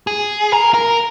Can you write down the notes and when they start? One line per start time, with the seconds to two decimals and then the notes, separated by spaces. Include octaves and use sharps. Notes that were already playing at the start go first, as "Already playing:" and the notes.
0.07 G#4
0.52 A#4
0.74 A#4